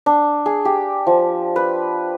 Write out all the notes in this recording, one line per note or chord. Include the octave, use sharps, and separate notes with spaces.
D4
G#4
G4
F3
B4